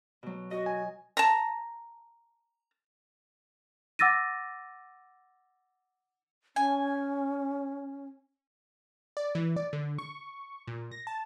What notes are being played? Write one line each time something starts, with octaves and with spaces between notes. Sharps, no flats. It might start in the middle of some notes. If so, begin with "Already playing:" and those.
B2 F#3
F#4 D#5
G#5
A5 A#5
F#5 D6 E6 A6 A#6 D#7
C#4 G#5
D5
E3
D5
D3
C#6
A#2
A#6
A5